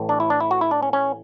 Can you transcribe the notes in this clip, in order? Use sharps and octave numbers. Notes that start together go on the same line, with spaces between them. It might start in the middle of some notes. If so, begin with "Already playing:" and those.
Already playing: A1 A2 E3
D4
E4
D4
E4
F#4
E4
D4
C#4
C#4